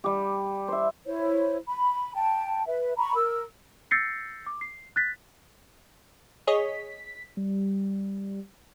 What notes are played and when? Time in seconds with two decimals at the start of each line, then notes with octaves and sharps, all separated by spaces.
0.04 G3 G4
0.68 C5 E5
1.05 E4 C5 C#5
1.66 B5
2.15 G5 A5
2.66 B4 E5
2.97 A#5 B5 C#6
3.15 A#4 E6
3.91 E6 G6 A6 A#6 C7 C#7
4.46 D6
4.61 C7
4.96 F#6 A6 B6
6.47 G#4 C#5 D#5 B6
7.37 G3